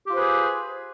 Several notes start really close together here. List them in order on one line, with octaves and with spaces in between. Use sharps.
G4 F4 C5 B4 G#4